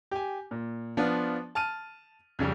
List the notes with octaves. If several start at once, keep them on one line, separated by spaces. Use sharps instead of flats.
G4 G#5
A#2
F3 B3 D4 F4
A5 F6 D#7
F2 C#3 G3